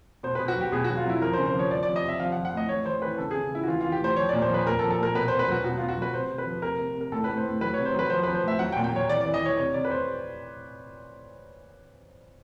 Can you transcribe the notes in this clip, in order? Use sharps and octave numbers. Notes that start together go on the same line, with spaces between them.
B2 C5
B2 B4
F#4
F#3
G4
B2 G#4
F#4
F#3
F4
F#3 E4
F3 A#4
C5
C#3
C5
F3
C#5
F3 D5
F3 D5
D#5
C3 E5
F3 F5
F#5
F3
F#5
A2 D#5
E3 C#5
E3 C5
E3 B4
C#3 A4
C#3 G#4
C#3 E4
F#4
E3 F4
E3 F4
G4
A2 C5
F3 C#5
A#2 D5
C5
F3 B4
A#2 A#4
A4
F3
A4
A#2 A#4
B2 B4
B2 C5
B4
F#3 F#4
B2 F#4
B2 F4
F#4
F#3 B4
C3 C5
C3
B4
F3
C3 A#4
C3
C3
A#4
A2 A4
A2 B4
C5
A2
F#3 B4
C3 C#5
C5
F#3 B4
F3 C5
F3 B4
C5
A2 E5
F#3 F#5
G5
A#2
G5
F#3 C#5
E3 D5
D5
E3
D#5
E3 C#5
C3 C#5
C3 D5
B4
C3 C5